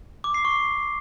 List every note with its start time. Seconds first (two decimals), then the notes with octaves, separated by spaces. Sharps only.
0.24 D6
0.34 C7
0.45 C#6